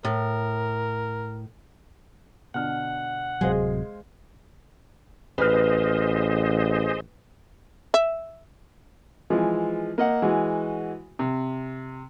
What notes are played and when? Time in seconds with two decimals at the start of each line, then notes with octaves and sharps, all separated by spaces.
0.05 A2 A#4
2.54 B2 D3 F#5 F6
3.41 D1 C3 F#3 G#3 C5 D#5 F5 G#5
5.38 A1 G#4 B4 C5 D#5 F6
7.94 E5
9.30 E3 F3 G#3
9.98 A#3 D#5 F#5
10.22 E3 G#3 F#4
11.19 C3